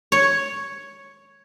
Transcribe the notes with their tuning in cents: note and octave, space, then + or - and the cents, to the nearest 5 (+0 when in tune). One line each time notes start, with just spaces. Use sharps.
C#5 +0